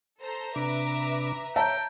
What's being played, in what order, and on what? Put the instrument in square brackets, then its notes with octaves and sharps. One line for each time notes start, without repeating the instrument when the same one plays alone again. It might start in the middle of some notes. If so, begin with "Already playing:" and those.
[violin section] A4 C5 A#5
[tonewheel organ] C3 D4 [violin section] B4 E5 A#5 [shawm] D6
[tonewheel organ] C#5 [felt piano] E5 A5 A#5 [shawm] G5